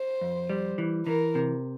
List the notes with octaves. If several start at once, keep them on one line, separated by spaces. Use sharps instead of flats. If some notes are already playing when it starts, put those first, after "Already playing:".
Already playing: C5
F2
G3
E3
E3 A#4
C3